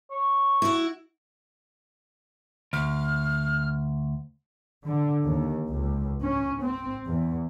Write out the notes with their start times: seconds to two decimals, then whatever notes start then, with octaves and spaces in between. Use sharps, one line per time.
0.11 C#5
0.62 E4 F#4
2.73 D2 F6
4.84 D3
5.26 D#2
5.68 C#2
6.22 C#4
6.62 C4
7.08 E2